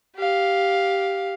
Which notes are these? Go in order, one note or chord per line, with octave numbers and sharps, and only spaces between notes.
G4 F5